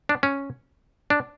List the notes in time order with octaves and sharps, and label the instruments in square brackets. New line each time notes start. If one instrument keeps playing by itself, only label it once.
[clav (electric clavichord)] D4
C#4
D4